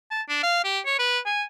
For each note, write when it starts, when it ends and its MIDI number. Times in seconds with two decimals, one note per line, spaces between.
0.11 0.22 81
0.29 0.43 62
0.43 0.63 77
0.64 0.79 67
0.86 0.95 73
0.99 1.19 71
1.26 1.43 80